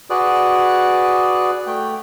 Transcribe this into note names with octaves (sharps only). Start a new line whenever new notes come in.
F#4 G#4 B4 D5
A3 G5